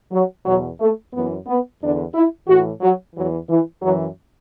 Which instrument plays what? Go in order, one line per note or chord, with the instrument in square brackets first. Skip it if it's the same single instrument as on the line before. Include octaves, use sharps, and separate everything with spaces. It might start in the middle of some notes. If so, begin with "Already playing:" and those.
[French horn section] F#3
E2 B2 F#3
A3
F#2 E3 B3
B3
E2 D3 D4
E4
A2 E3 F#4
F#3
E2 E3 F#3
E3
F#2 E3 F#3